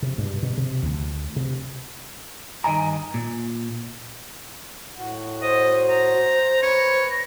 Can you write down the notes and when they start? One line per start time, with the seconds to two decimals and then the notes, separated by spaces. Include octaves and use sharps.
0.02 C3
0.18 G2
0.43 B2
0.57 C3
0.83 D2
1.36 C3
2.64 G2 D#3 D#5 G#5 A#5
3.14 A#2
4.96 A2 F#4
5.42 C5 D#5
5.89 A#5
6.63 B4 C#5
7.10 A#6